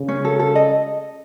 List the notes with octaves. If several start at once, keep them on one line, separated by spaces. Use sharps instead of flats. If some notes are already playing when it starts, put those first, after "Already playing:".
Already playing: C#3
C#4
A4
A4
D#5